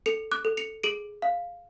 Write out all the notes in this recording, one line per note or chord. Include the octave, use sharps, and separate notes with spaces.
A4 C#7 F7
D6 F#6
A4
C#7 F7
G#4 D7 F#7
F5